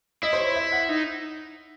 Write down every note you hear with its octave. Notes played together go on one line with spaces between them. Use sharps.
E4 D#5
C5
C#5
E5
F#5
D#4